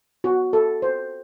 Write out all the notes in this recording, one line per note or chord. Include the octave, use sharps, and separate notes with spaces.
F#4
A4
C5